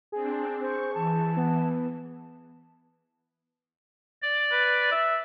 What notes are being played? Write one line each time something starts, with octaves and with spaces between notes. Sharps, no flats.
C4 D4 G#4
C5 C#6
E3 A5
B3
D5
B4
E5